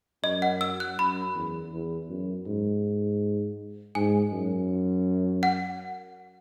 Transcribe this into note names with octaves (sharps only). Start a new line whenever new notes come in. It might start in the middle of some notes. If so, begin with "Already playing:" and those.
F#2 D#5
F#5
E6
F#6
F#2 B5
E2
E2
F#2
G#2
G#2 G#5
F#2
F#5